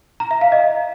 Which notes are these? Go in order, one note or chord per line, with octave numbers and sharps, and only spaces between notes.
A#5
E5
F5
D#5